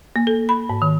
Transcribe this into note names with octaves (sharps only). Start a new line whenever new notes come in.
A#3
A4
B5
G#2
D#3